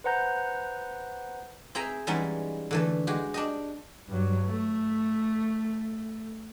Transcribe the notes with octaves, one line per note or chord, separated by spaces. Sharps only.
B4 C5 F#5 A#5 G6
C4 G#4 E5 G5 G#5 A#5
E3 G3 G#3 B3 C#4 D#4
D3 E3 A3
G#3 F#4 G4
D4 G4 D#5
G2 F#3
A3